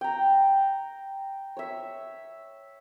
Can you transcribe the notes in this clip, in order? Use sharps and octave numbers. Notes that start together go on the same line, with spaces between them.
G5 A#5
C#5 E5